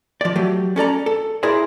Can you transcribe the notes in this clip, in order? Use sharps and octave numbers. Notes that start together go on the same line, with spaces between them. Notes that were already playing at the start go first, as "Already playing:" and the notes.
F3 D5
F#3 A3 G4
C#4 A4 D5 A#5
A4
E4 G#4 A#4 C5 D5 E5